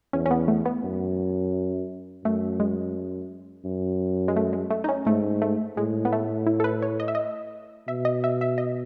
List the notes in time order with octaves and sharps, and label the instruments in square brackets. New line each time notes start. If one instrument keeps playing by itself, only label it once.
[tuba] E2 [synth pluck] C#4
[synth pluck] C#4
B3
A3
B3
[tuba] F#2
[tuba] F#2 [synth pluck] A3
[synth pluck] G#3
[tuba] F#2
[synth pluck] G#3
A3
G#3
A3
D#4
C#4
[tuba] G#2 [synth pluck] A3
[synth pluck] A3
[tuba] A2 [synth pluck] G#3
[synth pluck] B3
A3
E4
A4
B4
C#5
D#5
E5
D#5
[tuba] B2 [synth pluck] E5
[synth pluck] D#5
E5
E5
D#5